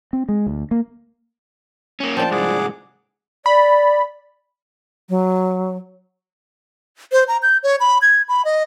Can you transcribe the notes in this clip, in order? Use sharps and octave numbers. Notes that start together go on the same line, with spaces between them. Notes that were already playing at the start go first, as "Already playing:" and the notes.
C4
G#3
D2
A#3
A#3 C#4
F3 D4 G5 A5
C2 G#2 G#4 F#5 D6
D5 B5
F#3
C5
A#5
G6
C#5
B5
G#6
B5
D#5